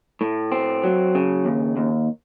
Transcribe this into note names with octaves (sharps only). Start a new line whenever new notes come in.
A2
C4
F#3
C#3
D#2
D#2